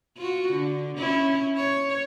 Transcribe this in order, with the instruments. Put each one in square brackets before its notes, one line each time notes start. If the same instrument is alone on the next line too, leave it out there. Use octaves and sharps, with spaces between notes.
[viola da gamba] F4 F#4
D3
C#4 E4
C#5